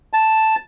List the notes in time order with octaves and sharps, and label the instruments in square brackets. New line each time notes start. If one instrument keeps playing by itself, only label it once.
[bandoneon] A5